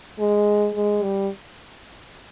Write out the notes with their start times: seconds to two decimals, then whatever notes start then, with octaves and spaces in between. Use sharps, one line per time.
0.19 G#3
0.75 G#3
1.03 G3